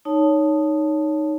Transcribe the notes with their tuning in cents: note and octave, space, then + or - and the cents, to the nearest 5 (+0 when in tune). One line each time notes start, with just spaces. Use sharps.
D#4 -5 C#5 +15 A5 +0